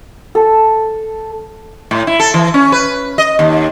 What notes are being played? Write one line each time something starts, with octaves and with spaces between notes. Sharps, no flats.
A4
A2
E4
A4
E3
C#4
B4
D#5
D#2